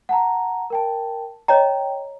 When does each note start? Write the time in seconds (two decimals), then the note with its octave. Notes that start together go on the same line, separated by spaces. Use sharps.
0.09 F#5 A5 A#5
0.70 A#4 G5 A5
1.48 C#5 D#5 G5 A#5